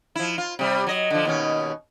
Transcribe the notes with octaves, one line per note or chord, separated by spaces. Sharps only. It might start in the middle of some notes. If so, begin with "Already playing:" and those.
F3 E4
F4
C3 G3
F#3 D#5
D3 F3
D#2 B2 C#4